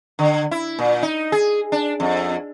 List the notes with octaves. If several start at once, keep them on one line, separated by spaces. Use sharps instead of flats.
D3
E4
A#2
D#4
G#4
D4
F2